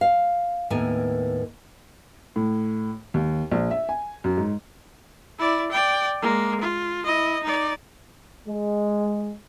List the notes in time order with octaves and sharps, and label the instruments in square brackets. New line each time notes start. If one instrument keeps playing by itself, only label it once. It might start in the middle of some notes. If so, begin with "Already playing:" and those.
[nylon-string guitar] F5
D#2 A2 B3 A#4 G#5
[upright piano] A2
D#2
A#1
E5
G#5
F#2
G#2
[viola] E4 D5
D5 G5
G#3 A#3
F4
E4 D#5
D#4 D5
[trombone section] G#3